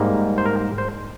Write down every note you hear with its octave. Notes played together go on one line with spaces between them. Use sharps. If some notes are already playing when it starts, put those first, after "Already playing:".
Already playing: G#2 G3 A#3
C5
A#4
C5